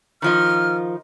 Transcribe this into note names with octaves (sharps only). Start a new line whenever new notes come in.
D#3 F3 D#4 F6